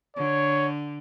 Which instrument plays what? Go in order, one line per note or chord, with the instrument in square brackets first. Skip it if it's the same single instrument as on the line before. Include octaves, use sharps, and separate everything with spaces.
[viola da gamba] D3 [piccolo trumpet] C#5